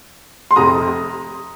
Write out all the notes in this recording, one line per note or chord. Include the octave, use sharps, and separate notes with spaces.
C6
F1 F2 C3 A#5 D#6